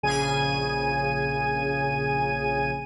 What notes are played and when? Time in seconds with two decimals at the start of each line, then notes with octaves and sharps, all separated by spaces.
0.03 A#1 C#3 G#4 G#5 D#7